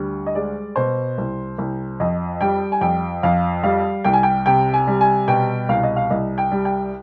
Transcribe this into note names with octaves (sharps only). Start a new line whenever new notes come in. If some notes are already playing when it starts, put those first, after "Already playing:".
Already playing: D2 G3
D#5
G#3 D5
B2 C5
C2
C2
F2 D#5
G3 G5
G#5
F2 G5
F2 F5
G3 F5
C2 G5
G#5
G5
C3 G5
G#5
G3
G#5
B2 G5
C2 F5
D#5
F5
C2 D#5
G5
G3
G5